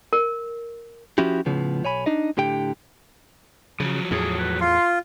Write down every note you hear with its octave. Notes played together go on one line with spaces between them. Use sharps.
A#4
F3 C#4 E4 F#4 G4
A2 C#3 F3 B3
B1 C#5 G#5 B5
D4 D#4 D#5
A2 D3 G4 G5
C#3 F3 F#3
E2 A2 G#4
B4
F4 C6